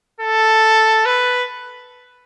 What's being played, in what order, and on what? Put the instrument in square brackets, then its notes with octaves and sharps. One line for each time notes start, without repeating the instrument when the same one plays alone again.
[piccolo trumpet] A4
B4